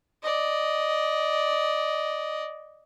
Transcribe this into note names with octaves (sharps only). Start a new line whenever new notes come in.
D5 D#5